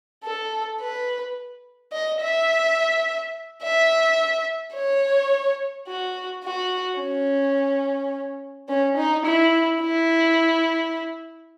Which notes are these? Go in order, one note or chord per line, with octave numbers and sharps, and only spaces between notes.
A4
B4
D#5
E5
E5
C#5
F#4
F#4
C#4
C#4
D#4
E4
E4